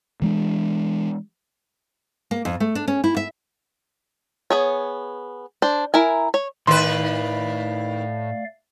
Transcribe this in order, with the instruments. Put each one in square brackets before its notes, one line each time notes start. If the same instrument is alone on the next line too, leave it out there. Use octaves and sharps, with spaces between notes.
[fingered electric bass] E3 G#3 D4
[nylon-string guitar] A#3
F2
A3
D4
C#4
E4
E5
[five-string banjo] B3 G#4 C#5
D4 C5
E4 A#4 G#5
C#5
[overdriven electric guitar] A2 [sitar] D#3 B4 [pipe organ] A3 D5 F5 [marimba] C6